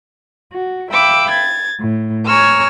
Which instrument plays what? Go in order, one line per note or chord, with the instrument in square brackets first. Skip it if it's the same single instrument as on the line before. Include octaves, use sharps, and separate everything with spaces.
[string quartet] F#4
E5 F5 G5 B5 D6 E6
G#6 A6
A2
C#5 G#5 A#5 C#6 E6 F6